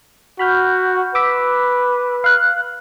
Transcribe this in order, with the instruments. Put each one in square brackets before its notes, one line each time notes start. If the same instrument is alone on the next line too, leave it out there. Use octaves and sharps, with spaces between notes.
[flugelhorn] F#4 [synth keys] B5 F6 G6
[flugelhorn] B4 [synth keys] D6 E6 B6
[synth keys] F5 F#6